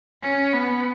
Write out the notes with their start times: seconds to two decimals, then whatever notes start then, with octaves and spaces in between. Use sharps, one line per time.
0.22 C#4
0.53 B3